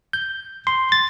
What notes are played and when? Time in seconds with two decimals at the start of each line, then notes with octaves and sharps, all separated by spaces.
0.13 G6
0.67 C6
0.92 A6